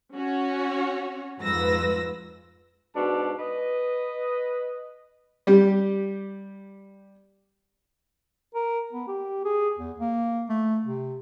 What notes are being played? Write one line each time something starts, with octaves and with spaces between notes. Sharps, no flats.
C#4 F#4 C#5
F2 G#2 F4 B4 E6 A#6
G#2 B2 D4 A5
B4 D#5
G3 G4
A#4
B3
G4
G#4
E2
A#3
A3
C3